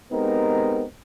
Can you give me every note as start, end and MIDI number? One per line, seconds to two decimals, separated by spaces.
0.12 0.84 56
0.12 0.84 59
0.12 0.84 60
0.12 0.84 63
0.12 0.84 67
0.12 0.84 70